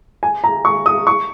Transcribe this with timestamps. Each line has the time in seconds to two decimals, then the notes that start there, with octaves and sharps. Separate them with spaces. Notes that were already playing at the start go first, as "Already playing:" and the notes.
0.23 G#5
0.44 A#5
0.65 C#6
0.86 D#6
1.07 C#6